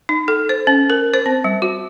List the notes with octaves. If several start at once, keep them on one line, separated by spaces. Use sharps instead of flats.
D#4
A4
C5
C#4
A#4
C5
C4
G3
F#4